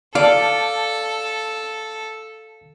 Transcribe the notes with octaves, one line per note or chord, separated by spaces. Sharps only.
A4 D5 F5 A5